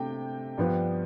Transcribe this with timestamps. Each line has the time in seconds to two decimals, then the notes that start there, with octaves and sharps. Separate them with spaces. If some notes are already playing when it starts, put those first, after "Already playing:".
Already playing: C3 A3 D4 G5
0.58 G2 F3 B3 D4